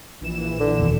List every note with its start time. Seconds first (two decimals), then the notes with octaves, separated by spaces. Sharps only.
0.21 A#1 E3 E7
0.60 D3
0.80 F1 D#2 B2